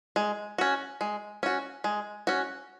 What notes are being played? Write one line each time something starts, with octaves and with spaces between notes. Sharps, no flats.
G#3
C#4 F#4
G#3
C#4 F#4
G#3
C#4 F#4